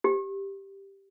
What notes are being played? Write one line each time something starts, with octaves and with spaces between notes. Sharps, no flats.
G4